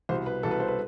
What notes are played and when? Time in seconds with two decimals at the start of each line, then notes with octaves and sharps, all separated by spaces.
0.09 C2 B2 C5
0.26 B4
0.43 C2 B2 A4
0.51 B4
0.60 C5
0.68 B4